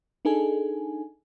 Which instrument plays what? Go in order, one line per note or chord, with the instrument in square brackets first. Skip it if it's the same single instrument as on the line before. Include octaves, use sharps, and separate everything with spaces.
[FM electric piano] D4 D#4 G#4 A4 G#5